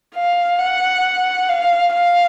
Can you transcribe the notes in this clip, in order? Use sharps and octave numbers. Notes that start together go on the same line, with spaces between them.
F5
F#5
F5
F5